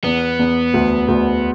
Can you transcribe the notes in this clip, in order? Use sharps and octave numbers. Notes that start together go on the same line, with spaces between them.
E2 B3
E2
D2
D2